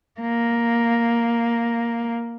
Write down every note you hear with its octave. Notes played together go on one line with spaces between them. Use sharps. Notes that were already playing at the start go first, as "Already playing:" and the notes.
A#3